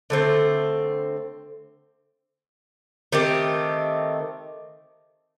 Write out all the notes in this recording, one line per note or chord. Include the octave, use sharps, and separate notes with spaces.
D3 A3 C4
D#3 A3 C4 G4